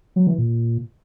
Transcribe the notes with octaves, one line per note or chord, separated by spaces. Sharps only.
F#3
E3
A#2